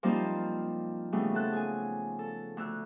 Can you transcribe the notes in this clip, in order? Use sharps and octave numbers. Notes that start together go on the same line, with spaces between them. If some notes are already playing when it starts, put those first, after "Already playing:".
F3 G3 A#3 C4 D#4 F4
C#3 G3 A3 B3
F3 A4 F#6
G#4 G#5
A4
D2 E6 F#6